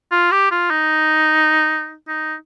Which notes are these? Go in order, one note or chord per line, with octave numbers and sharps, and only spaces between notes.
F4
G4
F4
D#4
D#4